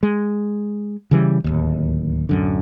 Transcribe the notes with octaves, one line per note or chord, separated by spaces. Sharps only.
G#3
C#3 E3 G3
D1 G1 D#2
D1 F#2 D3